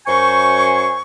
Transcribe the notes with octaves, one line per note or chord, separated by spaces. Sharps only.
F#2 C5 G#5 C#6